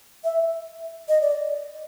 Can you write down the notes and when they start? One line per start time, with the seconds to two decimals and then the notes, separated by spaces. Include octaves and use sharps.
0.24 E5
1.09 D#5
1.21 D5